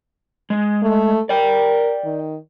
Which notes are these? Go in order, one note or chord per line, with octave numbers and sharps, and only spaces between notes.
G#3
A3
A#4 D5 G5
D#3